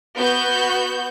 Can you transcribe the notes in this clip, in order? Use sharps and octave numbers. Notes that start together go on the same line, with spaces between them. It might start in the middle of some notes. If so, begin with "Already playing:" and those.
B3 F#4 G6